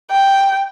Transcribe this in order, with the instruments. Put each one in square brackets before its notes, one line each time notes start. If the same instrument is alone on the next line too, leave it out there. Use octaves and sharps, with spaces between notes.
[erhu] G5